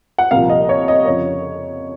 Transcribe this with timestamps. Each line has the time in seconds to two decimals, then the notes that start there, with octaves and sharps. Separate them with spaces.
0.18 F#5
0.31 C2 A#2 F3 F5
0.49 D#5
0.69 C#5
0.88 D#5
1.06 F2 C#3 F3 C#5